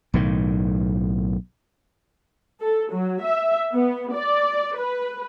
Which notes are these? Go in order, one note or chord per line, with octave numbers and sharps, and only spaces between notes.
B1 A2 D#3
A4
F#3
E5
B3
D5
B4